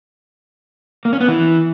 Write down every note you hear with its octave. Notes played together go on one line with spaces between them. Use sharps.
A#3
C#4
B3
E3